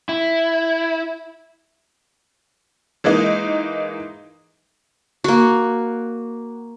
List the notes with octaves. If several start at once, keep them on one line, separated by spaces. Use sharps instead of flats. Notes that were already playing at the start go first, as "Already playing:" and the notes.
E4
E3 G#3 A#3 D#4
A#3 F#4